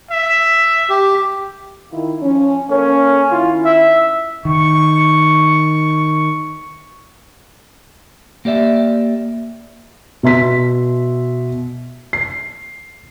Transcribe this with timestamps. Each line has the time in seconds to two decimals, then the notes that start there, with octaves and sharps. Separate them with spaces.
0.11 E5
0.90 G4
1.91 D#3 E4 F4
2.22 F3 C#4
2.70 A#3 C#4 A4 C#5
3.31 D#3 C#4 E4 F4
3.65 E5
4.45 D#3 C#6
8.45 A#3 G4 D5 E5
10.23 B2 E5 C6 B6
12.13 C7